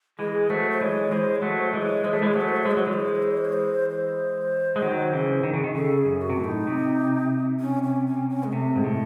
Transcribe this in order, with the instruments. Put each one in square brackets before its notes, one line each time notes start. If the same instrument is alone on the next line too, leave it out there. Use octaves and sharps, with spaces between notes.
[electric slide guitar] E3 G#3 [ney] G#4
[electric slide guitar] F#3 A3 [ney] C5
[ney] C5
[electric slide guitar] E3 G#3 [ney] C#5
[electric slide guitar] E3 G#3 [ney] C5
[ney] C#5
[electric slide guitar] F#3 A3
[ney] C5
[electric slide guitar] E3 G#3
[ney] C#5
[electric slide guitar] G#3 [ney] C5
[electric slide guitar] A3 [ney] C#5
[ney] C5
[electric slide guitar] E3 G#3 [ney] C#5
[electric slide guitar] F#3 A3 [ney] C5
[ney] C#5
C5
C#5
[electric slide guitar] G#3 [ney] C5
[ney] C#5
[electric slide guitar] F#3 [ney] C5
[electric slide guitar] E3 G#3 [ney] C#5
[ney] C5
C#5
C5
C#5
C5
C#5
C5
C#5
C5
C5
[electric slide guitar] G#3
D#3 F#3
C#3 E3
D#3
C#3
D#3
[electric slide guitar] C#3 [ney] A4
[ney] G#4
[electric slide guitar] F#2
[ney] F#4
[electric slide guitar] C3
A2
[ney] D#4
[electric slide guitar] C3
[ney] C#4
C#4
C#4
C#4
G#3
[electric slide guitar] C3 [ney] A3
[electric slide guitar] G#2
A2